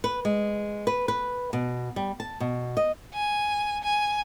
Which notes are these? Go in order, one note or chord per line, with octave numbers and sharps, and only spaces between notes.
B4
G#3
B4
B4
B2
G3
A5
B2
D#5
G#5
G#5